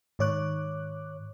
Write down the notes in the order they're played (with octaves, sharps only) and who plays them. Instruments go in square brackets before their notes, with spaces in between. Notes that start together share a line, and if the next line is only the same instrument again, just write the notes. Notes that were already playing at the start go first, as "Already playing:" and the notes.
[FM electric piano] G#2 D#3 C#5 D6 F#6